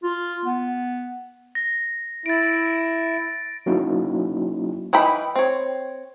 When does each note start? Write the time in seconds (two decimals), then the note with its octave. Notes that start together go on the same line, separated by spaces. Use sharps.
0.03 F4
0.45 B3
1.55 A#6
2.26 E4 A6 D7
3.66 F#3 A#3 C#4 D#4 E4 F#4
4.93 E3 D#4 G5 B5
5.35 C4 C#5